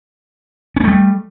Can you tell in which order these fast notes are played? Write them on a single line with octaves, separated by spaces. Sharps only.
C#4 A#3 A3 G3